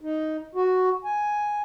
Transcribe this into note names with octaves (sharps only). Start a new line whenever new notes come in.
D#4
F#4
G#5